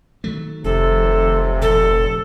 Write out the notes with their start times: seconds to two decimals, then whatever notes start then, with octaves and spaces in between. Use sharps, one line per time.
0.24 D#3 F#3 A3
0.64 F1 C3 A4
1.62 A#1 A4